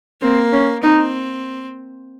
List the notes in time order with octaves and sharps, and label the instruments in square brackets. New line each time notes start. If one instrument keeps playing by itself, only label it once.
[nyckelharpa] A#3 [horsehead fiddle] C4
[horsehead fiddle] C#4
[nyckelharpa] C4 [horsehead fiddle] D#4